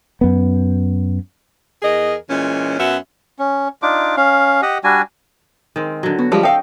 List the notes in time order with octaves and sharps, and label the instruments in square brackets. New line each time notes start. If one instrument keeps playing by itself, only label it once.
[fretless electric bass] F#2 B3
[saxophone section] E2 G#4 A#4 D#5
A#2 E3 G#3 C#4
F#2 B3 C#4 F#4 E5
[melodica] C#4
D4 D#4 F4 D6
C#4 F5
G4 D#5 F#5
G3 D4 F#4 G#5
[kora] D#3 G#3 C4
D3 F#3
[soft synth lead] B3 [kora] F#4
[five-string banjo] F3 G3 G#3 [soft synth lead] G4
[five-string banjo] A4 F5 [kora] D#5 [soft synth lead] G5